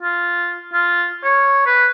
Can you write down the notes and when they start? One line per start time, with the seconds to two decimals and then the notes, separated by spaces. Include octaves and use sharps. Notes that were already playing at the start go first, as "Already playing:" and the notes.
0.03 F4
0.73 F4
1.24 C#5
1.66 B4